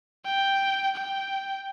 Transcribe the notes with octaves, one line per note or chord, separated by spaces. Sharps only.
G5
G5